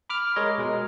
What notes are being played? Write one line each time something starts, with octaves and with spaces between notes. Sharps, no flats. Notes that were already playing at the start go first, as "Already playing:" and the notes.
B5 D6 F6
G#3 A#4 C#5 D#5
B2 G#3 A#4